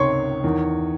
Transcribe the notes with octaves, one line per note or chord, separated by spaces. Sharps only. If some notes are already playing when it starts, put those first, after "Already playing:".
Already playing: C#2 C3 D#3 C#5 C6 C#6
E2 D#3